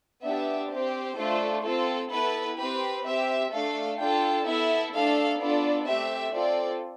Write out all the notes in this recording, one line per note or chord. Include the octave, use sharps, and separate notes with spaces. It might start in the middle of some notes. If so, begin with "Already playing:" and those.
B3 D4 G4 E5
C4 G4 C5
A3 D4 F4 A4
C4 F4 A4
B3 E4 A4 B4
C4 G4 B4
C4 G4 E5
A3 D4 A4 F5
D4 F4 A4 G5
B3 E4 A4 E5
A3 D4 A4 F5
B3 D4 F4 A4 D5
A3 C4 G4 E5
C4 F4 A4 D5